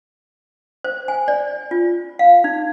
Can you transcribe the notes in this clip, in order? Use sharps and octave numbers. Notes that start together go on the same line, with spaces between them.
C5
G#5
D5
F4
F5
D#4